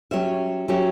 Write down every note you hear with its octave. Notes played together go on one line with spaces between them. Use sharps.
F#3 C#4 G4 C#5 E5
F#3 C#4 G4 C#5 E5